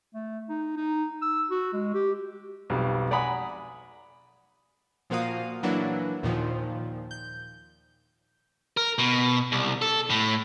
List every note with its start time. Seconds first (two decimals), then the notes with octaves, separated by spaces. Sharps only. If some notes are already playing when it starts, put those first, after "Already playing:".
0.14 A3
0.49 D#4
0.77 D#4
1.22 E6
1.50 F#4
1.73 G#3
1.94 G4
2.70 B1 F2 G3
3.11 D5 F#5 G#5 A#5 B5 D#6
5.10 A#2 F3 A#3 F#4 F5 D#6
5.63 E3 F#3 A#3 D4 E4 F#4
6.23 D#2 A#2 D#3 F3
7.11 G6
8.77 A#4
8.98 B2
9.52 C2
9.82 A4
10.10 A2